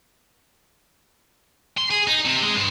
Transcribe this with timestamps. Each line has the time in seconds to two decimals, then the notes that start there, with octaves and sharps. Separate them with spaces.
1.78 C6
1.91 G#4
2.08 D#4
2.25 C3
2.42 G#3
2.56 G2